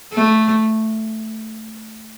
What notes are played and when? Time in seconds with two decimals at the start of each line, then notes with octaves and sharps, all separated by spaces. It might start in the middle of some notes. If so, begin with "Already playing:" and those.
0.13 A3